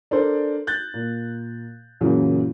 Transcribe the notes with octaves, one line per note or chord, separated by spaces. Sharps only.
D4 A4 A#4 C5 D5
F#6 G6 A6
A#2
F#2 A#2 C#3 E3 F#3 C#4